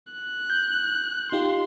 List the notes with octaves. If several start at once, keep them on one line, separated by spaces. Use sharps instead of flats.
F#6
G6
D#4 F4 G4 C6